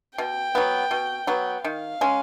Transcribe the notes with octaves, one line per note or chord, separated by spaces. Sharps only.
B2 G5
F#3 B3
B2
F#3 B3
D#3 F5
G#3 C#4